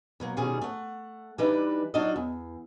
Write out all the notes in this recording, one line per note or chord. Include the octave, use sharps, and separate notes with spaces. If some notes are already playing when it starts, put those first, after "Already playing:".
B2 F#3 A#3
B2 D#3 G3 C#4 G#4
A3 F#5
E3 G3 D4 D#4 B4
F#3 D4 D#4 F4 F#4 D#5
E2